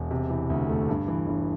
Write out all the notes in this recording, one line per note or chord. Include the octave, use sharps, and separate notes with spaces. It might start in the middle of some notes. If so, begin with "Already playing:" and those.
Already playing: E1
C3
E3
D2
A3
G2
E3
G1